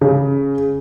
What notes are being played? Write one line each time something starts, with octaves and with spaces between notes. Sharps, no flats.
C#3